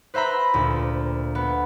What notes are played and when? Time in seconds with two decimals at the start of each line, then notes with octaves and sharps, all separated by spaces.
0.14 B4 C5 E5 A#5 B5
0.54 D2 A#2
1.35 B3